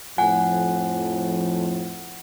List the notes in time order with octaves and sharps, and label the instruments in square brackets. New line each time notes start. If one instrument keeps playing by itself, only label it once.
[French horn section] F2 A2 F3 [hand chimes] F#5 [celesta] G#5